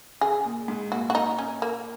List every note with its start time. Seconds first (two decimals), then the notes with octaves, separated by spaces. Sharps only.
0.21 C#3 G#4
0.45 A#2
0.68 G#2
0.92 A#2 F#4
1.10 F#4
1.15 D#4
1.39 C#4
1.62 A#3